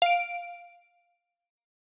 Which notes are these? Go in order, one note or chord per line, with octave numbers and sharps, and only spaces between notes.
F5 D7